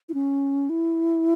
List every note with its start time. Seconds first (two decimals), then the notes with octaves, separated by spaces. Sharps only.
0.09 E4
0.14 C#4
0.70 E4